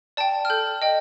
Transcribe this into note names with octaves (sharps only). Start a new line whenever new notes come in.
D5 G5 A5
F6
A4 G6
D#5 G5